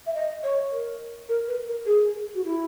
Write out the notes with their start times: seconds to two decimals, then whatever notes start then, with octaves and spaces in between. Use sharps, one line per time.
0.06 E5
0.14 D#5
0.43 C#5
0.72 A#4
1.29 A#4
1.47 B4
1.67 A#4
1.86 G#4
2.34 F#4
2.44 E4